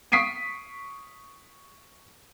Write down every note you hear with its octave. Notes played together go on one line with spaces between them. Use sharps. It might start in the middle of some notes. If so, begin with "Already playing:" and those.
C#6 D#6 B6 C7 D7 D#7